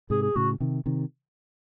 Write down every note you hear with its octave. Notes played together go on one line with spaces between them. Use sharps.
G#2 C3 G#4
G#4
A2 C#3 F#4
C3 D#3
C3 D#3